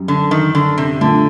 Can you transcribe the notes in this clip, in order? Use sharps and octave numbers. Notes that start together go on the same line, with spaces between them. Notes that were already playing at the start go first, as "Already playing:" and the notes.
Already playing: F#2 G3
D3
D#3
D3
C3
A#2 D3 A3 D4 A4